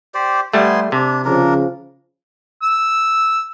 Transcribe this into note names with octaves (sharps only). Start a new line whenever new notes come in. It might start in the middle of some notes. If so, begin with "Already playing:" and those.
G4 C5 D5
G3 A3 B3 G#5 C6
C3 D4
C#3 F3 D4 A#4
E6